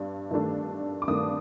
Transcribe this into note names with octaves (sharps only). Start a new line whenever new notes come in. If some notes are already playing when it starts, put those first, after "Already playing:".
Already playing: G2 D4
G2 D#3 A3 D4
D6
G2 D#3 A3 D4 D#6